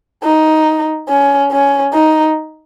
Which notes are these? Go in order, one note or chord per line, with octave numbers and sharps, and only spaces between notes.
D#4
C#4
C#4
D#4